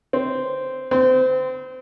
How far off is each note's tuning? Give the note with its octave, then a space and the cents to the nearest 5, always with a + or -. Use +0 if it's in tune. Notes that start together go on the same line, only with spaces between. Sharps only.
C4 -10
C4 -30